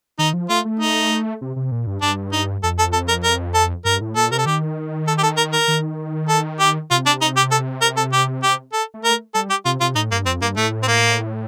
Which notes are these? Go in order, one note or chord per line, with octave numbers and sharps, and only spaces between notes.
D#3 D#4
F3
A3 F4
A3
D#4
C3
C3
A#2
G2
G2 D4
D#4
F2 A4
A4
A4
A#4
A#4
A4
G2 A#4
A2
A#2 A4
C3 A#4
A4
D#3 G4
A4
G4
A4
A#4
A#4
D#3
A4
G4
C3 F4
D4
D#4
G4
A4
A#4
A4
G4
G4
A4
A3
A#4
G3 A4
G4
C3 F4
C3 F4
A2 D#4
G2 A#3
F2 C4
G2 A#3
A2 A3
C4
A#3